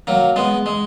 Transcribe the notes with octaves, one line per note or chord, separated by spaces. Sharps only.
F#3 A#3
G#3 B3
G#3